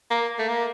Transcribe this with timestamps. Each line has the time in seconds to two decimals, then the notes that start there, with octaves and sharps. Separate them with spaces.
0.11 A#3
0.39 A3
0.48 A#3